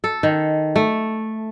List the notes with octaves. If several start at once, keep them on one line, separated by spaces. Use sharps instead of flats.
A4
D#3
A3